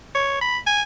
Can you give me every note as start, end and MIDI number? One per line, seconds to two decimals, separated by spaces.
0.15 0.37 73
0.41 0.58 83
0.66 0.82 80